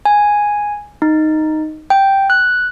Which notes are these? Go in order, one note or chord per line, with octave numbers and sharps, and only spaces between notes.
G#5
D#4
G5
F#6